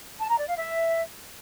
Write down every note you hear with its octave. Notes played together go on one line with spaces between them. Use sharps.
A5
A#5
D5
F5
E5